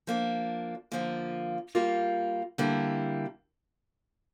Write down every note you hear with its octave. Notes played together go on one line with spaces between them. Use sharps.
F3 A#3 D4
D3 F3 A#3 F4
G3 A#3 F4
D3 G3 A#3 E4